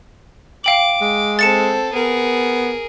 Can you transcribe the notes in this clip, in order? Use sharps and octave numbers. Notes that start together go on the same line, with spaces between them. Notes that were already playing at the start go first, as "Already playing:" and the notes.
F5 G5 D6 F#7
G#3
C4 A4 A6 C#7 E7
B3 G#4 A#4